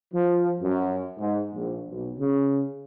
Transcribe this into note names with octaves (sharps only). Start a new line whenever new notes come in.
F3
F#2
G#2
A#1
B1
C#3